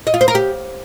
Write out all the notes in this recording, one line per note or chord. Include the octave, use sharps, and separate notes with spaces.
D#5
F4
C5
A#4
G4